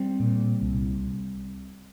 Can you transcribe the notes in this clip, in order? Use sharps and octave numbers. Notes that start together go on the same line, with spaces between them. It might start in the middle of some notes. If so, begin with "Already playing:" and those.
Already playing: G3 C4
A#2
C2